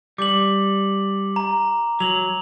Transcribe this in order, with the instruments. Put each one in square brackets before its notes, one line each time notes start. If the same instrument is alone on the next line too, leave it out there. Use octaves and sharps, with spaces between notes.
[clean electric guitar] G3 [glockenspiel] D6 F#7
[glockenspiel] A#5
[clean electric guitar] F#3 [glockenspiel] F7 F#7